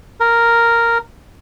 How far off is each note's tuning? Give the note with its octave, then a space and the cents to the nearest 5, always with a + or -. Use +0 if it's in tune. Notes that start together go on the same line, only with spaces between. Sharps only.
A#4 -5